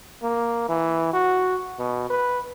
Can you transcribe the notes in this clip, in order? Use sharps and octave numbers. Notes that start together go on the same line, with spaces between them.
A#3
E3
F#4
B2
B4